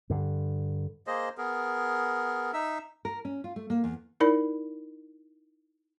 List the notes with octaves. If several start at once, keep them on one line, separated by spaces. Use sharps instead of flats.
G2 D3
A#3 G#4 C5 D#5
B3 G#4 A#4
D#4 E5 E6
A#4
C#4
F4
A3
A#3
E2
D#4 E4 A#4 D5 B5